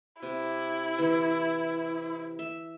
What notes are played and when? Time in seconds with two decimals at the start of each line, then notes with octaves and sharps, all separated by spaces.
0.23 C3 E4
0.98 E3
2.39 E5